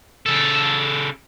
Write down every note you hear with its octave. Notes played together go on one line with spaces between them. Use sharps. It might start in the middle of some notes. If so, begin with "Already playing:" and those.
C#3 A4